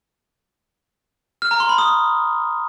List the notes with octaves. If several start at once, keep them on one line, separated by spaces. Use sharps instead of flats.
F6
A#5
C6
B5
D#6